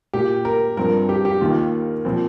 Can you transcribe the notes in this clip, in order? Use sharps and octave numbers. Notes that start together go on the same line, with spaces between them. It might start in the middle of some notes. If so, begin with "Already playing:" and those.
A#2 A#3 G4
A#4
G2 F3 C4 A#4
G4
G4
D#2 D#3 A#3 F4
A#2 F3 C4